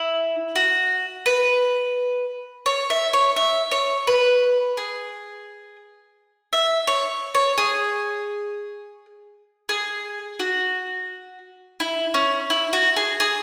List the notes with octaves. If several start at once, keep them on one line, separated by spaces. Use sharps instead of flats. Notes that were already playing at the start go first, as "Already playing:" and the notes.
Already playing: E4
F#4
B4
C#5
E5
C#5
E5
C#5
B4
G#4
E5
C#5
C#5
G#4
G#4
F#4
E4
C#4
E4
F#4
G#4
G#4